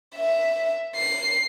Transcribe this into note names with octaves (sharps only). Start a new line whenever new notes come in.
E5
C7